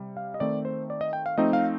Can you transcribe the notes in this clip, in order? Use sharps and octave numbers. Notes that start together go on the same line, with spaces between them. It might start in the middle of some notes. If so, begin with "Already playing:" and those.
Already playing: C3 G3
F5
D#5
D#3 A3 C4 D#4 D5
C5
D5
D#5
G5
F5
F3 A3 C4 D#4 D#5
F5